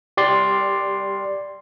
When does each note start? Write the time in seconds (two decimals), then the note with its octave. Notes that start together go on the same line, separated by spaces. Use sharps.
0.17 G4 D5 C6